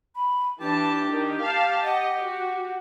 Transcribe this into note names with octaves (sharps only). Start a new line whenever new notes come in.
B5
E3 D4 G4 A5
D#3
F5 A5
D#5 F#5
F#4